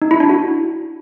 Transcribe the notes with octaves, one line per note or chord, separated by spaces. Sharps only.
D#4
E4
D4
F#4